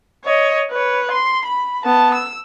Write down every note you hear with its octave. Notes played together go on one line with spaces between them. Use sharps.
C#5 D#5
B4 C#5
C6
B5
B3 A5
E6